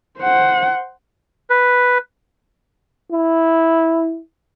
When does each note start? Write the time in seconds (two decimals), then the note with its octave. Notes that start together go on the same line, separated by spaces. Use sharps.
0.20 C5 F#5
1.50 B4
3.12 E4